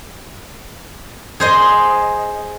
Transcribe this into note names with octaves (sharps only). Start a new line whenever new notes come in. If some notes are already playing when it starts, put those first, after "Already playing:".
G#4 C5 D#5